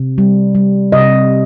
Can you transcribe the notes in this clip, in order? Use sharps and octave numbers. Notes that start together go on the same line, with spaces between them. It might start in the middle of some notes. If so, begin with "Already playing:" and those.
Already playing: C3
G3
G3
C3 D#5